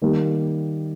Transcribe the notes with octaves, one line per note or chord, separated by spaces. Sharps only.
D#3 G3 A#3